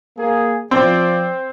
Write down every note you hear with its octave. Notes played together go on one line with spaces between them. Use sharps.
A#3 G#4
F3 C4 D5